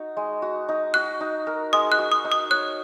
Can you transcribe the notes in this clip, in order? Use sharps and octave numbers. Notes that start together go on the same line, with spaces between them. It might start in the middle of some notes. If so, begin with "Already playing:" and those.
Already playing: D#4 F#4
G#3
F#4
D#4
F#4 F#6
D#4
A#4
G#3 D#6
F#6
F#4
D#6
D#4
D#6
C#5 F#6